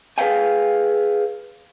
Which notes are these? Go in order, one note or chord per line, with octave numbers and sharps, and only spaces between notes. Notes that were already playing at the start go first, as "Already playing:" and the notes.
G#4 B4 E5 F5 G5 G#5